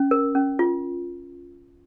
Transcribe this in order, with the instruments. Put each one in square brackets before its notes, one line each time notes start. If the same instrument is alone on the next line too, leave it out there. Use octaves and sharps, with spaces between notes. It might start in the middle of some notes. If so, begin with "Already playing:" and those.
Already playing: [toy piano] C#4
A#4
C#4
F4